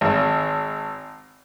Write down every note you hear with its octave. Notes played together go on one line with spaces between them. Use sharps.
G#1